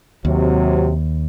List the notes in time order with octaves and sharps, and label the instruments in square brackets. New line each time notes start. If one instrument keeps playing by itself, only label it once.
[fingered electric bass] D#2 [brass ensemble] C3 F#3